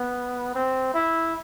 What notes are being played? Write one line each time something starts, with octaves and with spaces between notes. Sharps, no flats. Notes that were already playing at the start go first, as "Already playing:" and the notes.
Already playing: B3
C4
E4